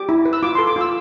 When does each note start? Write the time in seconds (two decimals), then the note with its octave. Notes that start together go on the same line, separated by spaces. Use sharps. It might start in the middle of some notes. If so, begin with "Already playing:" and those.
Already playing: G4 D6
0.09 E4
0.25 B4
0.33 E6
0.43 F4 D6
0.55 A4 C6
0.67 D6
0.76 F4 E6